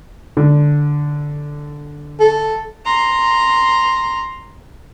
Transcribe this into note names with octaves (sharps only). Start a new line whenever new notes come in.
D3
A4
A#5 C6